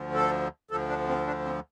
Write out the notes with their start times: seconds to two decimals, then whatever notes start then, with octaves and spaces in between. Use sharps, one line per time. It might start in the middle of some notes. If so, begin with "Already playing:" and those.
Already playing: D2 D3 F3
0.14 A4
0.71 D2 D3 F3 A4
0.89 D4
1.08 C4
1.27 D4
1.46 C4